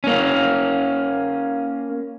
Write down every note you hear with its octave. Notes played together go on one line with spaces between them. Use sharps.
A#3 C#4